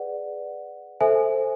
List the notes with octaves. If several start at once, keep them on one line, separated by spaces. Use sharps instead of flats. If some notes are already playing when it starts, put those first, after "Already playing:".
Already playing: G#4 B4 D5 F#5
A4 C5 E5 G#5